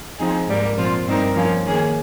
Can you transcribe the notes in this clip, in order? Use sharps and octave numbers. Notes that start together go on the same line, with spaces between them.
F3 C4 D#4 G#4
G#2 G3 A#3
A#2 F3 C4 F4
G2 G3 C4 D#4 A#4
F3 A#3 C#4
D#3 A#3 C#4 G#4